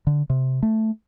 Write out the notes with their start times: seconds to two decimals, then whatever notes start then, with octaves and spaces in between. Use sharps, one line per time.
0.07 D3
0.30 C3
0.63 A3